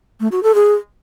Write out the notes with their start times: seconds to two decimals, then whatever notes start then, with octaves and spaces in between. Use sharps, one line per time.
0.20 A3
0.32 F#4
0.43 A4
0.55 G#4